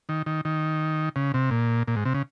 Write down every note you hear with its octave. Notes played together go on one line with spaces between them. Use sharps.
D#3
D#3
D#3
C#3
C3
A#2
A#2
G#2
C3
C#3